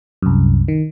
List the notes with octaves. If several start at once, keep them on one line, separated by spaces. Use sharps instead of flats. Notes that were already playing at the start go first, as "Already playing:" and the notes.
C2 F#2
D#3